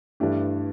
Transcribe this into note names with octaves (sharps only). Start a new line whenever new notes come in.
G2 E3 A3 D4 G4